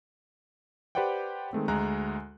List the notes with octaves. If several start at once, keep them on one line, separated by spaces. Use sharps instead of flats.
G4 B4 C5 D5 F#5 G5
D#3 G#3 A3 C4
D2 G#3 A#5 F#6